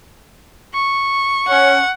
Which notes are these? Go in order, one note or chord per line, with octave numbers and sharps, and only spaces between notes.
C#6
C#4 F#5